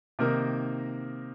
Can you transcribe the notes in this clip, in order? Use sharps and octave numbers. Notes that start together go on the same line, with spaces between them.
C3 D#3 A#3 D#4 A#4